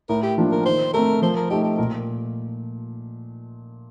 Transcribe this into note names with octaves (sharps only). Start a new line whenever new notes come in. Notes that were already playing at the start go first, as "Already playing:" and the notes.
A2 A#4
G4
F3 A#3 D4 F4
A#4
D#3 C5
A3 C4 A#4
F3 C5
A#4
A3 D#4 G4
G4
A#2 A#4